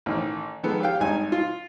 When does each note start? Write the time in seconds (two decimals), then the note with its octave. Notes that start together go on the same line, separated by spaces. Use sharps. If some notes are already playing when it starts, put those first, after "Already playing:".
0.06 A1 D#3
0.63 D#3 F3 G#3 B3 A4 B4
0.80 G4 C#5 F5 G5
1.00 G#1 G2 D#4 G#5
1.32 F4